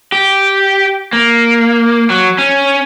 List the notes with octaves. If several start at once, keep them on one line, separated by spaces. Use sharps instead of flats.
G4
A#3
F#3
C#4